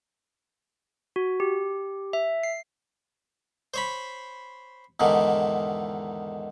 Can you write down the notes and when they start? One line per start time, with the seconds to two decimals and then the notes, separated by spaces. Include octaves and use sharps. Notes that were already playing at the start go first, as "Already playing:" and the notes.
1.16 F#4
1.40 G4
2.13 E5
2.43 C7
3.74 C5 C#5 B5
5.00 E2 G#2 D3 D#3